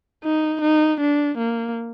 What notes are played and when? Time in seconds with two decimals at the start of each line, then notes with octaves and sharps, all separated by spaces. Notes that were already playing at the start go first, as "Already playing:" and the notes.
0.24 D#4
0.62 D#4
1.00 D4
1.38 A#3